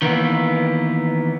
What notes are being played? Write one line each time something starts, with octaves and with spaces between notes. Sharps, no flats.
D#3 E3 A#3 B3